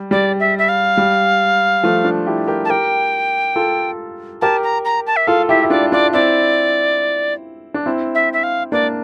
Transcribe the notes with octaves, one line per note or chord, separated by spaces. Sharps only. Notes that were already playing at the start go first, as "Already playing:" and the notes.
Already playing: G3
G3 D5
E5
E5
F5
G3
F3 A3
D4 F4
E4 G4
G4 A#4
A5
G4 A#4 G5
F4 A4
G4 A#4 A5
A#5
A#5
A5
E5
F4 A4 F5
E4 G4 E5
E4
D4 F4 D5
D4 F4 D5
C4 E4 D5
D4
C4 E4
E5
E5
F5
A#3 D4 D5